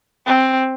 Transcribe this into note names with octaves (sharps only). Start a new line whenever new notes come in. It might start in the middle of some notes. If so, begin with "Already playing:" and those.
C4